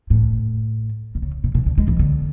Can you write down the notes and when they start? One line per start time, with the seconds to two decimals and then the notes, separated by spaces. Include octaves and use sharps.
0.10 A2
1.15 B2
1.22 C#3
1.44 B2
1.55 B2
1.66 D3
1.78 G#3
1.88 E3
1.99 D3